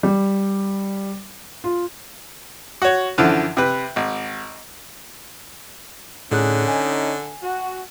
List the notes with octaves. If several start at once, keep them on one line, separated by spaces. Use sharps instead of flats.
G3
F4
F#4 C#5
F#2 D3 E3 F3
C3 B4
G#1
A2 D3 C#4 D#4 G#4 F#6
G#5
F#4